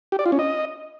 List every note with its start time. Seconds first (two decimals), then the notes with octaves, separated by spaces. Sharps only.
0.12 G4
0.19 D5
0.26 F4
0.32 C#4
0.39 D#5